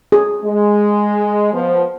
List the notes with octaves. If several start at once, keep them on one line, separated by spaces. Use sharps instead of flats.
G#4
G#3
F3 B3